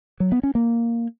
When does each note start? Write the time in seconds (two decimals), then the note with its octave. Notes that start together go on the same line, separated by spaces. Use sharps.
0.20 F#3
0.32 B3
0.43 C#4
0.55 A#3